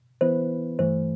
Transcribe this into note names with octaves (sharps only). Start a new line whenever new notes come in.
E3 B3 E4 B4 C5
G2 E3 A3 C5